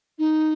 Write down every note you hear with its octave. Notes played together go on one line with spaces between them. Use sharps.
D#4